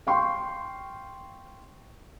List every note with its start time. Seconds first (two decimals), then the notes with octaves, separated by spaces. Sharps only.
0.07 F5 G5 C6 C#6